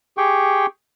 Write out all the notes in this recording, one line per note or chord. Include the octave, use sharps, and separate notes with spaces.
G4 G#4 G5 C#6